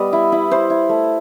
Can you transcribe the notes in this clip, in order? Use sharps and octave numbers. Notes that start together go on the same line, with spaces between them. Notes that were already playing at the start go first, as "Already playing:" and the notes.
Already playing: G3 B3 D#5
E4
E4
E4 C5
E4
A3